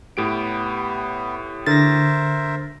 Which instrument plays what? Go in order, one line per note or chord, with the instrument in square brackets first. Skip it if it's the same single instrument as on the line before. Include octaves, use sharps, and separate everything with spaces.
[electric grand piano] A2 G4 D7 [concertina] B3
[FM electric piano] D3 [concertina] A#4 C5 E5 [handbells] A6 A#6